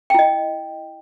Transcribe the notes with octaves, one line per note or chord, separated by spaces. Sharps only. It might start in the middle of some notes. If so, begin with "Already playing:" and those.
E4 D#5 G5